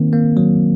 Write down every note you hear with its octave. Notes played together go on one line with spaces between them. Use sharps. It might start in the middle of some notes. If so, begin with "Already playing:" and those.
Already playing: D#3 A#3 C4
A#3
F#3